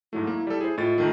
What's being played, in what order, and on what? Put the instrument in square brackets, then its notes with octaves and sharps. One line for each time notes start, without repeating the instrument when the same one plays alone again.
[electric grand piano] G#2 F#3 A3 [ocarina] E4
[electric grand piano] A#3
G3 A4
[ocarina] E4 [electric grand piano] G#4 C5
[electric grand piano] A2 D#5 A6 [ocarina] F4
[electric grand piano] D#2 D#3 A3